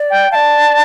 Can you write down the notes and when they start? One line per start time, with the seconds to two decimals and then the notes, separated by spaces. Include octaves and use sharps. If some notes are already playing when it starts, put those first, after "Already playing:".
Already playing: D5
0.10 G5
0.31 D5 F5 A5